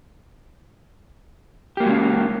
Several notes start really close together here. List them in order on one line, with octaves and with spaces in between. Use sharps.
G4 A#3 F#4 G#3 C#4